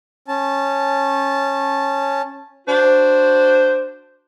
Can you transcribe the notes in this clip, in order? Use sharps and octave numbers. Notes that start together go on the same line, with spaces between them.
C#4 A5
D4 F#4 C5